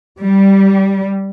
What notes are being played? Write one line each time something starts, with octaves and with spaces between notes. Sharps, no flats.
G3